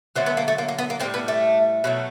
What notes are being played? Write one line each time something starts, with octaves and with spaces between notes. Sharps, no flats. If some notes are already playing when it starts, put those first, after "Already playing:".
D3 F#3 A3 C4
B3
A#3
A3
A#3
A#3
B3
A#3
A2 E3 G3 C4
B3
A3
B2 F#3 A3